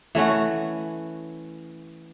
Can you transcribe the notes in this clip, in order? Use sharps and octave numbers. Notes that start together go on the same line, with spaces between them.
E3 A3 C#4 F#4